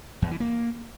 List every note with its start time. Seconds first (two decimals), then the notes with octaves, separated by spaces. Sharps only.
0.22 E2
0.31 E3
0.40 A#3